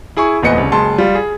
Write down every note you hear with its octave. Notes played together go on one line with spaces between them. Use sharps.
E4 G#4 G#5 C#6
F1 E2 A#2 B4 D#5 C#7
C2 C#3
F#1 G#3 A5 C6
G3 F4
G#4